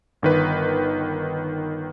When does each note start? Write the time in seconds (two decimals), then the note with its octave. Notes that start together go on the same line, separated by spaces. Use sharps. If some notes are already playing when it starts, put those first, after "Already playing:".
0.22 G1 D#3 B4